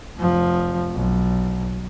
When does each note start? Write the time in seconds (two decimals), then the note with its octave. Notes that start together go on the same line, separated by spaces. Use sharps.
0.18 F1 F3
0.94 B1